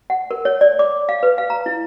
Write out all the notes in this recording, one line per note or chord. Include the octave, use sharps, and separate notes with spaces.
F#5
A#4
C#5
D5
D6
F5
B4
F5
A#5
E4